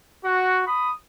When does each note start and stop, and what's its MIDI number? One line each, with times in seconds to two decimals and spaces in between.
0.23 0.61 66
0.66 0.92 83
0.66 0.92 87